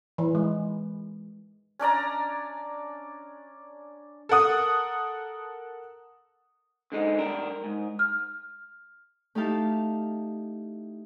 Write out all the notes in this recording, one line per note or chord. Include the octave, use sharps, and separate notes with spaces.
E3
G#3
C#4 D4 D5 A#5
A4 A#4 F#5 D#6
D3 G#3 D#4
G2 D4 A#4
G#2
F6
A3 D#4 E4 G4 F5 A5